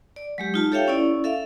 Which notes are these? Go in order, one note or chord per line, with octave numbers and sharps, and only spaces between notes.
D5
F#3 G#3 G4
D#4 F4 A5
G4 A4 C#5 E5 F5 G5
C#4 E4 D5
A4 E5 F5